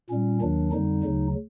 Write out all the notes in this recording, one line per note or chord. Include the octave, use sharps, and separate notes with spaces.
A#2 G3 C#4
D#2 D#3 F#3 D4
F2 D3 G3 D#4
D2 C#3 F#3